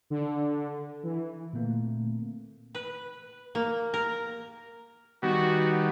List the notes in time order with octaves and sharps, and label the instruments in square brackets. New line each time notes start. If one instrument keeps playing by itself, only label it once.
[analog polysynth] D3
E3
[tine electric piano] A#2 D3 A3 A#3 C4
[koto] B4
A#3
A#4
[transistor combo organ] D#3 G3 B3 [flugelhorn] F#4